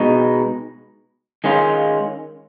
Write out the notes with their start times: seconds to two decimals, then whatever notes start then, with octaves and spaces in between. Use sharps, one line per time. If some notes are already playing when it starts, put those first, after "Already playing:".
Already playing: B2 G#3 D#4
1.44 D#3 G#3 C#4 F4